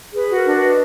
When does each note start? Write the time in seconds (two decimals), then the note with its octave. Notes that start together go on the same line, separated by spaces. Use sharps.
0.13 G#4 B4
0.30 F#4
0.35 A#4
0.45 D4
0.57 B4
0.62 D#5